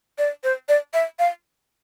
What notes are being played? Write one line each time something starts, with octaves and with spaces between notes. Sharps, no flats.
D5
C5
D5
E5
F5